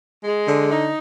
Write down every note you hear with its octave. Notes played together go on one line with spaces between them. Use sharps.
G#3
D3
D#4